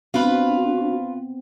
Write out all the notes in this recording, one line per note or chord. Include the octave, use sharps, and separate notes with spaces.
B3 C4 D4 F4 F#4 B4